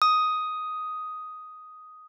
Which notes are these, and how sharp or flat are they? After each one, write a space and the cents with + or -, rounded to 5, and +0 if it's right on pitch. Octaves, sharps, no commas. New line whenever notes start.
D#6 +5